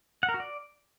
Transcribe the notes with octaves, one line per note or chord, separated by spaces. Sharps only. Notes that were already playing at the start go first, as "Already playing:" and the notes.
F#5
A#4
F#4
D5